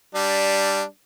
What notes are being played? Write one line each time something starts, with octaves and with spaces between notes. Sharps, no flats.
G3 D4